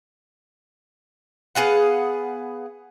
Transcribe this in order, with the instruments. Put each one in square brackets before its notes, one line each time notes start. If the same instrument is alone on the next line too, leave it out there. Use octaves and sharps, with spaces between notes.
[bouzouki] B3 G#4 F5 F#5